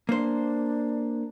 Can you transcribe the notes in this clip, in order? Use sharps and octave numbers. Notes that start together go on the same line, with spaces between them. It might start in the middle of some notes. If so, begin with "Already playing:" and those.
A#3 D4 C5